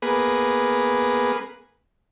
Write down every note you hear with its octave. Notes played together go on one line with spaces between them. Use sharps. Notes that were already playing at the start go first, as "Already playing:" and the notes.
A#3 B3 G#4 B4